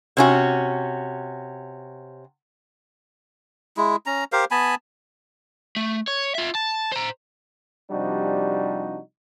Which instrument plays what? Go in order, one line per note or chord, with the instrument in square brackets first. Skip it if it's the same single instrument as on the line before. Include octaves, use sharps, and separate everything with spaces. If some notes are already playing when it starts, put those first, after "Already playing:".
[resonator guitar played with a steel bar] C3 C#4 F#4
[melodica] G#3 E4
C#4 A#5
G4 A#4 C5 F5
B3 G#5 A5 B5
[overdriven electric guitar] A3
C#5
F4 E5
A5
C5 A#5
[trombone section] C3 F3 G3 D4 D#4 F#4